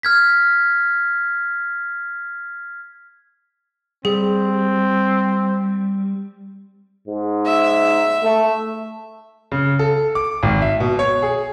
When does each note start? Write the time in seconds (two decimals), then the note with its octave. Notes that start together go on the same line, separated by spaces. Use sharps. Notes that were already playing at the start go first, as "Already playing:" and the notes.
0.03 F6 G#6 B6
4.05 G3 C4 G#4
7.08 G#2
7.47 E5
8.23 A3
9.52 C#3
9.79 A4
10.15 D6
10.43 G#1
10.62 E5
10.80 B2
10.99 C#5
11.23 G#4